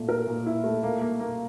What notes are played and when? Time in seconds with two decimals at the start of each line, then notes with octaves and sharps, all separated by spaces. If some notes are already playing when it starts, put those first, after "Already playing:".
Already playing: A#2 A3
0.09 A#4
0.27 A#2
0.46 E4
0.64 A3
0.83 A#3
1.01 A#3
1.20 A#3